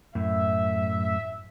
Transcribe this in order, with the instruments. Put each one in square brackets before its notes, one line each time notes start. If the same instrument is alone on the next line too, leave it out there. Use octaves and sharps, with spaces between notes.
[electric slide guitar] F#2 A2 [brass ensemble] E5